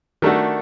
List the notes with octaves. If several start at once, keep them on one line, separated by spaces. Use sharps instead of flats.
D#3 A3 D4 F#4 A4